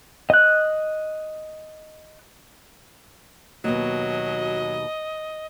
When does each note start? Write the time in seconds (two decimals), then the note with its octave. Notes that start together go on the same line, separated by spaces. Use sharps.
0.30 D#5 F#6
3.64 D#2 B2 F#3 D#5